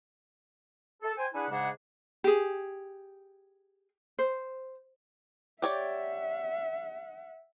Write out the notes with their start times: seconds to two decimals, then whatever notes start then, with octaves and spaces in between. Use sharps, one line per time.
1.02 A4
1.18 C5 G5 G#5
1.34 D4 E4 G#4 B4 F#5 G#5
1.50 G#2 C#3 G#3 D4 G#4 F#5
2.24 G4 G#4
4.19 C5
5.62 G4 C#5 D5 E5 F#5